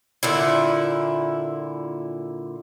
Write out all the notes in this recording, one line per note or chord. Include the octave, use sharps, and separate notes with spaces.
A#2 D3 E4